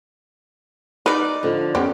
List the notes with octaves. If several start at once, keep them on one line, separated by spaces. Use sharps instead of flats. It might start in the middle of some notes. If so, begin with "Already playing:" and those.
D#4 A#4 B4 D5
D3 F3
F2 B3 C#4 G4 A#4